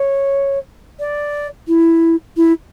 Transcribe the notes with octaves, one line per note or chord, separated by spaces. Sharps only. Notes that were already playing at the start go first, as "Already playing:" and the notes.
Already playing: C#5
D5
E4
E4